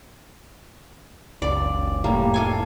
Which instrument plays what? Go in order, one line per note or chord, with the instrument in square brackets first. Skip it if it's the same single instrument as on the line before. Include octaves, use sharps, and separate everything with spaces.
[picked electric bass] F#1 C#2 [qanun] D5
[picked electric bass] F1 A2 [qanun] G3 A#3
[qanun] F4 A4 G#5